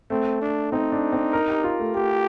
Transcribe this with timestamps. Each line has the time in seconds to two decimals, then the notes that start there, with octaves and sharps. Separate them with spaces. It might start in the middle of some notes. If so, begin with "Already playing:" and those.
0.10 A3 C4
0.42 D4
0.72 C4 D#4
0.92 D4
1.13 C4
1.33 A#4
1.48 G4
1.64 F4
1.80 A3
1.95 A3 G4